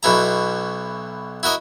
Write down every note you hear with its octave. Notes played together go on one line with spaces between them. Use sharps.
B1 B2 E4 A#5
E4 F#4 A#4 D#5